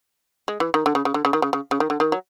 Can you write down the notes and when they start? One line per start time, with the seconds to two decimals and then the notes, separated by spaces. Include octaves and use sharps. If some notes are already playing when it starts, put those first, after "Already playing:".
0.48 G#3
0.60 E3
0.74 D#3
0.86 D3
0.95 C#3
1.05 C#3
1.14 D3
1.25 C#3
1.33 D#3
1.42 C#3
1.53 C#3
1.71 C#3
1.80 D#3
1.90 D3
2.00 D#3
2.12 F#3